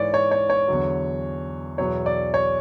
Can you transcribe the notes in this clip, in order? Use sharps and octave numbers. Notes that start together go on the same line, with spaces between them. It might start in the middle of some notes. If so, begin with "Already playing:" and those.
Already playing: G#2 E3 C#5 D5
C#5
C#5
C#5
E2 D3 F#3
E2 B2 F#3 C#5
D5
C#5